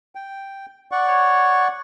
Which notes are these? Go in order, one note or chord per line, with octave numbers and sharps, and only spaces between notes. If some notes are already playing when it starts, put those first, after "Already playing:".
G5
D5 F#5 C#6
C#5